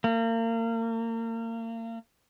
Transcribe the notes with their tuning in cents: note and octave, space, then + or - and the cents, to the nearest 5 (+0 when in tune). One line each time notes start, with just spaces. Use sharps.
A#3 -35